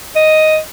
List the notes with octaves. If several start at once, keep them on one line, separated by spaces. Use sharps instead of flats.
D#5